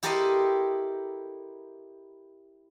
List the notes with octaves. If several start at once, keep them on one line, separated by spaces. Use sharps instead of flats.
E4 G4 A4 A#4 C5 D#5